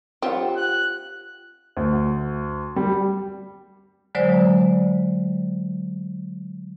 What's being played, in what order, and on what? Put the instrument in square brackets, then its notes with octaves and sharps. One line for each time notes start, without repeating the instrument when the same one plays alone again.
[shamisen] C4 [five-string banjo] F4 G4 F#5
[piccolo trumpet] F#6
[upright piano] D2
G3
[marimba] D3 F#3 G#3 C5 D5